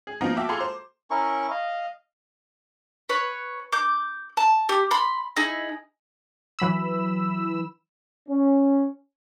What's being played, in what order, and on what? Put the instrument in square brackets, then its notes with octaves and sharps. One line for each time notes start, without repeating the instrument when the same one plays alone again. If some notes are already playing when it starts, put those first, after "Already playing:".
[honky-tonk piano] G#4
F3 A#3 B3 D#4 F4 F#4
F#4 E5 G5 A5 D6
F4 F#4 G#4 A4 A#5 C6
C5
[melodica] C#4 E4 A#4 C#6
D#5 F5
[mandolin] B4 C#5
D6 G6
A5
G4
B5 C6
D#4 E4 G#4
[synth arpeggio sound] E3 F#3 B5 E6
[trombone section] C#4